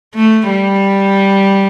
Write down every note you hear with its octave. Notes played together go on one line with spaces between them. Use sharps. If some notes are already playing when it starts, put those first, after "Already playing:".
A3
G3